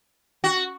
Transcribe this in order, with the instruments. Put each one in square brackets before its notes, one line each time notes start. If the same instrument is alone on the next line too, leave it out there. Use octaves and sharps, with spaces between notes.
[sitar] F#4